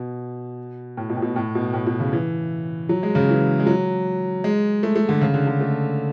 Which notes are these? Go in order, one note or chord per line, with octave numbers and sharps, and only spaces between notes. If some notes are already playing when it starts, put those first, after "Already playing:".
Already playing: B2
A2
B2
A2
B2
A2
B2
A2
B2
C#3
E3
F#3
G#3
C#3
E3
G#3
F#3
G#3
A3
A3
D3
C#3
D3
D3
A3